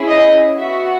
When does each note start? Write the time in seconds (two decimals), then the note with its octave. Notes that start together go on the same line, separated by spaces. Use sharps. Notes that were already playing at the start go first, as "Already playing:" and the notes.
Already playing: C#4 E4 G#4
0.08 D#5
0.58 B3 F#4 E5